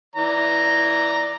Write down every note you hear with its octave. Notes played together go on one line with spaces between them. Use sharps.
E3 D5 A#5